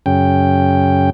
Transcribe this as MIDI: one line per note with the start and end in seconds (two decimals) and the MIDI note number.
0.06 1.10 42
0.06 1.10 49
0.06 1.10 79